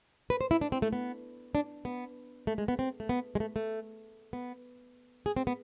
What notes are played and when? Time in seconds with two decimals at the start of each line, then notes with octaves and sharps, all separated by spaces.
0.30 B4
0.41 C5
0.51 E4
0.61 D4
0.72 C4
0.82 A3
0.93 B3
1.55 D4
1.85 B3
2.47 A3
2.58 G#3
2.68 B3
2.79 C4
3.00 A3
3.09 B3
3.35 G#3
3.40 A3
3.56 A3
4.33 B3
5.26 G#4
5.37 C4
5.47 B3